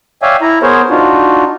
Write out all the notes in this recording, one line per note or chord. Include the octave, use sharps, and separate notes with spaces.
C#5 D5 E5 F5 G5 G#5
E4 A#5
B3 G#4 A#4 C5 C#5
D4 D#4 F4 F#4